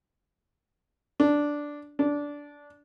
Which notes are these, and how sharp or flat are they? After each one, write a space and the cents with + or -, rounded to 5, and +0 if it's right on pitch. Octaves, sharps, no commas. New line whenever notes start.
D4 -5
D4 -15